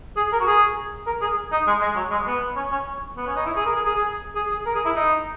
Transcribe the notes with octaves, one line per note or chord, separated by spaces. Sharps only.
G#4
A#4
F#4
G#4
A#4
G#4
D#4
G#3
G#3
F#3
G#3
B3
C#4
C#4
B3
C#4
D#4
E4
G#4
A#4
G#4
G#4
G#4
G#4
G#4
A#4
G#4
E4
D#4